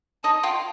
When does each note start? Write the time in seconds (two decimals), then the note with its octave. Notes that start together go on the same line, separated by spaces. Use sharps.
0.24 D#4 A5
0.43 F4 G5